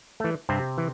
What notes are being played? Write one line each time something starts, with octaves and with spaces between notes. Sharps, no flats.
E3 A3
G2 C3 C4
E3